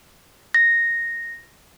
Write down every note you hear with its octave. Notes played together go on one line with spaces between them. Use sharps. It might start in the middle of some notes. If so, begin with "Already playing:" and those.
A#6